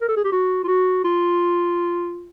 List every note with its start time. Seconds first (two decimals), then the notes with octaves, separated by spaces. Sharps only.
0.01 A#4
0.09 A4
0.17 G#4
0.25 G4
0.32 F#4
0.64 F4
0.68 F#4
1.04 F4